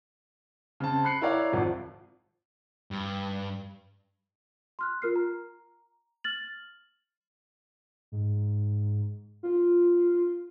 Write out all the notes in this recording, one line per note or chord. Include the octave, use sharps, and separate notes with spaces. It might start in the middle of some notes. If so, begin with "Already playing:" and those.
C#3 C4 A5
B5 F#6 C7 C#7
E4 A#4 C#5 D5 F5 A#5
G#1 F2 C3 F3
G2
C6 F6 F#6
F4 A#4 F6 C7
A#5
F6 A6 F#7
G#2
F4